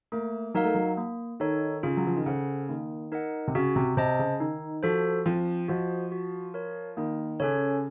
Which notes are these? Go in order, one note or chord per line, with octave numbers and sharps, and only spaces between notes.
A3 A#3
F#3 D#4 A#4 F5
A3
F#3
A#3
D#3 D#4 A4 C#5
C#3 F4
F#3
F3
D#3
C#3 A4 C5 F#5
D#3 A#3
D#4 A#4 D#5 F#5
C3
C#3 F#4
C3
C3 C5 D#5 A5
C#3
D#3 D#4
F3 F#4 A4 C5
F3 C4
F3 F#4 C5 D#5 F#5
F#4
A#4 C#5
D#3 A#3
C#3 C#4 A4 C#5